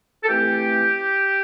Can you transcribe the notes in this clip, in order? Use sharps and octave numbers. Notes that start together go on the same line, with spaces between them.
A4
E3 A3 C4 G4